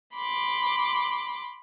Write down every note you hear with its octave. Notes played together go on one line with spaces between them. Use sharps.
B5 C6 D6